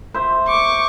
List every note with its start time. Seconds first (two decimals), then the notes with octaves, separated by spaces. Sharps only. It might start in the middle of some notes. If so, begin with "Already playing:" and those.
0.14 C5 E5
0.48 C#6 D6